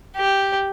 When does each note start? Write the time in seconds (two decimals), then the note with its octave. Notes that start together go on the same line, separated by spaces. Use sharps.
0.16 G4